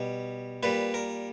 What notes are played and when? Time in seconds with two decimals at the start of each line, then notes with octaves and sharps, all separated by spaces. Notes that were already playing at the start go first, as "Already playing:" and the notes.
Already playing: B2 G3
0.63 A#2 G3 B4
0.94 A#4